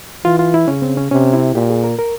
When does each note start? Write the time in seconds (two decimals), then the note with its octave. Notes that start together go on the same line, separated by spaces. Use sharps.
0.25 E3 F4
0.39 F4
0.54 E4
0.68 C#3 C#4
0.82 C4
0.97 C#4
1.11 C3 C#4
1.33 E4
1.55 A#2 G4
1.70 G#4
1.84 A#4
1.99 A#4